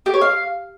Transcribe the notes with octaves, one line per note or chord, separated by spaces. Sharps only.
G4
C#5
F5